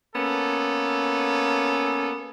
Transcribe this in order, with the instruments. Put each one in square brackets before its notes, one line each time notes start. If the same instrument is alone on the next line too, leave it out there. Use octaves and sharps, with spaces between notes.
[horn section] A#3 B3 C#4 A4